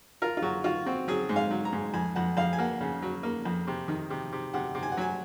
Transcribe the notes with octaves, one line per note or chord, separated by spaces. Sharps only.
F4 A#4
F4
F#3 F#4
F4 F#4
C4 F#4
F#3 G#4
G#2
F5
F#3
A#5
G#2
F2 G#5
F2 F#5
F2 F5
G#5
A#3 F#5
C#3
F#3
A#3
F2
C3
D#3
C3
C3
C3 F#5
C3
G#5
F#5
F#3 G#5